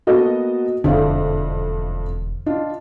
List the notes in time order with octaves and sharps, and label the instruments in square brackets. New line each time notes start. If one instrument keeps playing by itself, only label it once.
[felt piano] A#3 B3 A4 [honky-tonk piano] F#4 D#5
[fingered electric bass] E1 [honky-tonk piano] F2 [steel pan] D3 [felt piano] D5 E5 F5
[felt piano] D4 F4 D#5